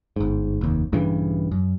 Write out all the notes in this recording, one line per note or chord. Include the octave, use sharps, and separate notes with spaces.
G1 G#2
F1 D#2
A#1 G2 C#3 E3
F#2